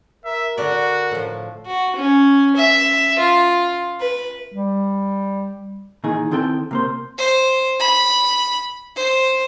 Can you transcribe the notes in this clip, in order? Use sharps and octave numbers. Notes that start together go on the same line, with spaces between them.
A#4 E5
D3 D4 F#4 D5
A2 F3
F#4
C#4
E5
F4
B4
G3
A#2 D#3 E3 D#4 G#4
D#3 C4 E4 A4 B4 G5
C3 A#3 C5
C5
B5
C5